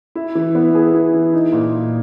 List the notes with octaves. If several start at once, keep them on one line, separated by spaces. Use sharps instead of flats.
E4
E3
B3
G#4
E4
E3
D#4
A#2